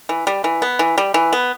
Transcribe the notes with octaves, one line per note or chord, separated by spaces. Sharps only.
E3
G3
E3
B3
E3
G3
E3
B3